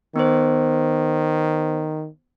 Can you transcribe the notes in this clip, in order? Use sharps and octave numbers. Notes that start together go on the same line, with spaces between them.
D#3 B3 C5